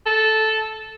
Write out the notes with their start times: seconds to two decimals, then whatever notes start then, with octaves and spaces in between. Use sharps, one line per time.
0.06 A4